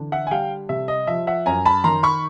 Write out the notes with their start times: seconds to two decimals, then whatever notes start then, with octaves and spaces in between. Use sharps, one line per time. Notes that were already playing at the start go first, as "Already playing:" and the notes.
Already playing: D3 E3
0.12 E5 F#5
0.27 G#5
0.31 G3 F5 G5
0.69 C3 E5
0.88 D#5
1.07 F3 E5
1.27 E5 F#5
1.46 F#2 G#5 A#5
1.65 A5 B5
1.84 D#3 A#5 C6
2.03 B5 C#6